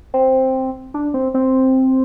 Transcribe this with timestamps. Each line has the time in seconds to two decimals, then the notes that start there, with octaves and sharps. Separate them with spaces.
0.14 C4
0.94 D4
1.14 C4
1.34 C4